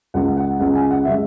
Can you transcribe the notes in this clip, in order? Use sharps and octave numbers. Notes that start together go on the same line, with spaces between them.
C#2 C#3 G#3 F#5
F#5
C#2 C#3 G#3 F#5
G#5
F#5
C#3 G#3 E5